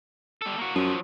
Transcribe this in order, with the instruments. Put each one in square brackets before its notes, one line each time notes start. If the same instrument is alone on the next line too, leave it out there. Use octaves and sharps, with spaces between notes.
[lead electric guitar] G3 A4
A#3 F#4
[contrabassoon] F#2 [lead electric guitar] F3 F#3